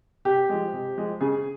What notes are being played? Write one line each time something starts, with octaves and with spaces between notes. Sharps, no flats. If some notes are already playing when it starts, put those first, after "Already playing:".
C3 G4
F3 G#3
C3
F3 G#3
C#3 G#4